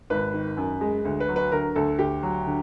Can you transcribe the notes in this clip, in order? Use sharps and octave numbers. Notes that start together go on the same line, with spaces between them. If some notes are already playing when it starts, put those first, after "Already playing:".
G#1 B4
D#3
F#2
G#3
D2
B4
F#3
B4
D3 A#4
D2 A4
D2 G4
F#3
D3